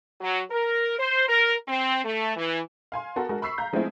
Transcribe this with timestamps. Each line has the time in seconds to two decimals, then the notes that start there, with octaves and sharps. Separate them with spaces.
0.21 F#3
0.51 A#4
0.99 C5
1.29 A#4
1.68 C4
2.05 A3
2.36 E3
2.92 F5 G#5 C6
3.16 B3 F#4 A4 A#4
3.29 G#3 F#4 A4 A#4
3.42 B5 C#6 E6 B6 C7
3.58 F5 A#5 G6
3.73 F3 G#3 A3 B3 C4 E4